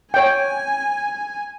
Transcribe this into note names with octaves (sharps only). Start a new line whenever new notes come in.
C#5 G5 G#5